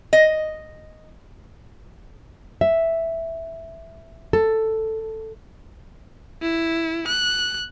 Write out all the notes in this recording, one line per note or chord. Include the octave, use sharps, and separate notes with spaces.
D#5
E5
A4
E4
F#6